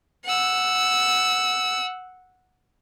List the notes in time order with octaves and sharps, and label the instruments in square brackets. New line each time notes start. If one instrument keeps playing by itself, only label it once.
[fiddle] F#5 E6